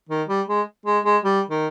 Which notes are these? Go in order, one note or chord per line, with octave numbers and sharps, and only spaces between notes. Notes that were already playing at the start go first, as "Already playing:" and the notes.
D#3
G3
G#3
G#3
G#3
G3
D#3